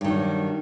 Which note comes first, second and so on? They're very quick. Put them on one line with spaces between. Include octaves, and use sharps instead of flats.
G2 D#3 F#3